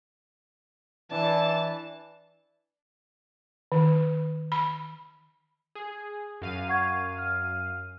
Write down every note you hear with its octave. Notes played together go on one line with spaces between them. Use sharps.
E3 D4 A5
D#3
B5
G#4
F#2 F5 D#7
F#5 C#6 G#6
F6